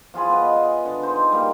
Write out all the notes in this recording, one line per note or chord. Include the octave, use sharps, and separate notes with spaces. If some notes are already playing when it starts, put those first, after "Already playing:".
F3 F4 G#4 B5
B3 B4 D#5
G#4
D3
D#4 C5
G3 A#3